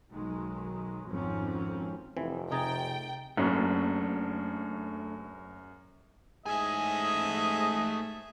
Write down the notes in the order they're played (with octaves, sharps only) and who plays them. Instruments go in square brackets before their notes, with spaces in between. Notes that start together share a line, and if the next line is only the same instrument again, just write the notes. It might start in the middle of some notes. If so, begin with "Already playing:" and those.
[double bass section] B1 D#3 F#3 G#3
G#1 F2 G#2 F3 C4 C#4
[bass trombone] F1 [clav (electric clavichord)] E3 [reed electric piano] C4
[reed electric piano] C3 A#5 A6 [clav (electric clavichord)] D#4 G#4 [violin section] G5
[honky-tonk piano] F#1 [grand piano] F#2 [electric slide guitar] A3 D4
[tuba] G#2 [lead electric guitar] A3 G#5 [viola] G#4 E5 [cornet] D#5